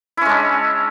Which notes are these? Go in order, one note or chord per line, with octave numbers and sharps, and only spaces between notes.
G#3 C#4 D4 E4